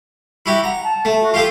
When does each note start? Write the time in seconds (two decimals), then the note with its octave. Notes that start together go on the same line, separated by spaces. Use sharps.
0.46 E4 F#4 G4
0.64 F#5 A#5
0.83 A5
1.05 A3
1.21 F#4
1.34 F4 G4 A4 F5